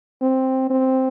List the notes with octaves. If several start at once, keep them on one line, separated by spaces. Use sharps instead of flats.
C4
C4